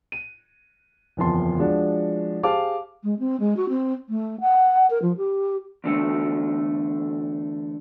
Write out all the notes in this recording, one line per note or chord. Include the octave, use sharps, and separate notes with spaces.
D#7
F#1 E2 F3 C4 A5 C6
F3 G#3 D4 F#4
G4 G#4 C5 F5 A5 D6
G#3
C4
G#3
F#4
C4
A3
F#5
A#4
F3
G4
E2 D3 A3